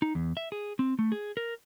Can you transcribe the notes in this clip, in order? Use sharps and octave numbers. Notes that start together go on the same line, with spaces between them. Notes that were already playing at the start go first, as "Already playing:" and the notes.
D#4
E2
E5
G#4
C4
A3
G#4
A#4